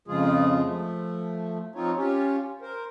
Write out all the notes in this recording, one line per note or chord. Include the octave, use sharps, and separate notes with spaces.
F2 C#3 F3 G#3 F4 G#4
F3 A3
F3 C4 D#4 F4 C#5
C#4 F4 G4 C#5
A#4 C5